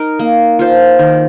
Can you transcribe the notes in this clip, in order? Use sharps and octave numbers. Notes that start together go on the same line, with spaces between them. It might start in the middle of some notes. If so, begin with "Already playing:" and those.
Already playing: D#4 A#4
A#3
F4 C5
D#3